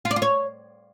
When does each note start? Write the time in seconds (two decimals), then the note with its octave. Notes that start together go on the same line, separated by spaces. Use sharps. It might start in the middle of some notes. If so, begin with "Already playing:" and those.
0.05 F4
0.11 D5
0.16 F4
0.22 C#5